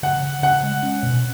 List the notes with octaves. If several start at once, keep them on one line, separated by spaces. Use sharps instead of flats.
C#3 F#5
C#3
C#3 F#5
G#3
C#4
B2